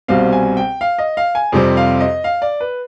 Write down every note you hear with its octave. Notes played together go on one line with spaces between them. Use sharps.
C2 B2 G3 C4 F5
G#5
G5
F5
D#5
F5
G#5
F2 C3 G3 C4
F5
D#5
F5
D5
B4